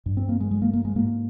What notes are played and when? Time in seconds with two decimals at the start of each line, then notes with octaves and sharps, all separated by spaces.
0.06 G2
0.17 C4
0.29 A#3
0.40 G#3
0.51 G#3
0.62 A#3
0.73 A#3
0.85 G#3
0.95 G#2 A#3